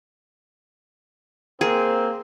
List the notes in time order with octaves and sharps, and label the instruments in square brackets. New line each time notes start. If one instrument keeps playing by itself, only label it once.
[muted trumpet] A#3 [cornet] C4 [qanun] G#4